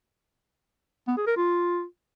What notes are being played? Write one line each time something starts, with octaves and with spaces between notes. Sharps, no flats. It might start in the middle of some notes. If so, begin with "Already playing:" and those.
B3
G#4
A#4
F4